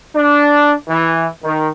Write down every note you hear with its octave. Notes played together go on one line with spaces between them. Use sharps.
D4
E3
D#3